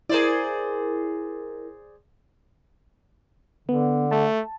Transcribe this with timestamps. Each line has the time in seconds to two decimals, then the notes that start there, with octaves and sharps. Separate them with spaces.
0.09 E4 G#4 A#4 C5 D5
3.69 D3 B3
4.11 A3 A5